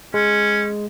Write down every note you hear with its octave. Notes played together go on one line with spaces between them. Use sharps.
G#3 C#4